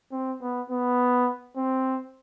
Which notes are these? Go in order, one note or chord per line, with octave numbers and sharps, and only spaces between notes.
C4
B3
B3
C4